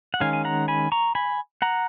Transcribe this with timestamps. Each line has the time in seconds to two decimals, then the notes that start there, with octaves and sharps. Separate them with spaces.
0.14 F#5
0.20 D#3 G#3 C#4 F5 G#5
0.33 G#5
0.45 F#5 A#5
0.68 G#5 B5
0.92 A#5 C#6
1.15 G#5 B5
1.62 F#5 A#5